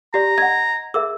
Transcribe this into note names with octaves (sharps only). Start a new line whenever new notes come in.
G4 D5 A#5
D#5 F#5 G#6
G#4 A#4 E5 E6